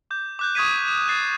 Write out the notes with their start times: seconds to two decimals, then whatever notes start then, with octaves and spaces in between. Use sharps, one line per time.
0.11 D6 G6
0.39 D6 F#6 G6
0.55 C#6 D#6 G#6 B6 D#7
0.88 E7
1.08 F#6 A6 C7 D#7